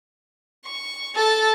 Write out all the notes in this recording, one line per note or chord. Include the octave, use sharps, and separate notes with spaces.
C#6
A4 A6